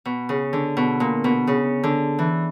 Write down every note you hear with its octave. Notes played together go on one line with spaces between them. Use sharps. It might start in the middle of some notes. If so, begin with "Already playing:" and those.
B2
C#3
D3
B2
A#2
B2
C#3
D3
E3